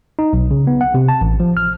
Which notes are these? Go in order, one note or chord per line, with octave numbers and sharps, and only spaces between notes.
D#4
B1
C#3
B3
F#5
C3
A5
A1
F3
F6